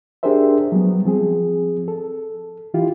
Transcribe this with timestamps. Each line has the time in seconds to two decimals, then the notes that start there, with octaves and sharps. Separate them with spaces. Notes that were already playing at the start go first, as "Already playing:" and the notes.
0.23 D4 G4 G#4 A#4 C5 E5
0.72 F#3 G3 B3
1.05 F3 C4 G#4
1.88 A4
2.74 E3 E4 F4 G4